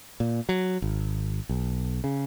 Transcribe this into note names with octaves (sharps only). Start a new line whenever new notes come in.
A#2
F#3
G#1
B1
C#3